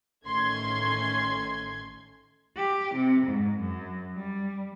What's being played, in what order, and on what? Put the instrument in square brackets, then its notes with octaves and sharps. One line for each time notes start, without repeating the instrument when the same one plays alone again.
[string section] A1 D#3 A3 C#4 C6 G#6
[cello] G4
C3
G#2
F#2
G3